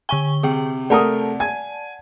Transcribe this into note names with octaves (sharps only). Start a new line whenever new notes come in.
D3 G#5 C#6 G7
C3 G#4 G5
A3 A#4 D5 F#5 A5 D#6
G#5 G#6